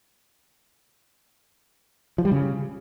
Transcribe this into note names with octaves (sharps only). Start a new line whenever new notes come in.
F3
G3
C#3